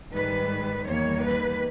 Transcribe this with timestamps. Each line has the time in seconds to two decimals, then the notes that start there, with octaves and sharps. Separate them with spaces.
0.13 G#2 D#3 G3 B4
0.86 E2 D#3 G3 A#3 C#5
1.22 B4